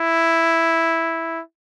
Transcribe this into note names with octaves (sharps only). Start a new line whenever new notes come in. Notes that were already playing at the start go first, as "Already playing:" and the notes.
Already playing: E4